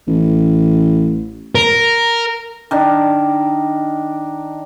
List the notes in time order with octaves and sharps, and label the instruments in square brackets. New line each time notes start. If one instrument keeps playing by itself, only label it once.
[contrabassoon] A1
[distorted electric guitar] A#4
[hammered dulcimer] D#3 D4